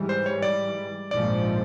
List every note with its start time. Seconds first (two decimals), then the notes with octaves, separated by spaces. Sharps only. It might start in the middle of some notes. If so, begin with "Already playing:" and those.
Already playing: G#2 E3 G3
0.09 C5
0.26 C#5
0.42 D5
1.11 A#1 G#2 F3 D5